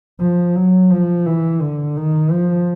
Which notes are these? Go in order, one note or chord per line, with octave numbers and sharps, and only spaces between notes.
F3
F#3
F3
E3
D3
D#3
F3